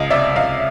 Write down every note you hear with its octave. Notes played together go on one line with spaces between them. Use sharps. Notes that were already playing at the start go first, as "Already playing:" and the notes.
Already playing: C#2 D#5 F5
C3 D5 E5
C#2 D#5 F5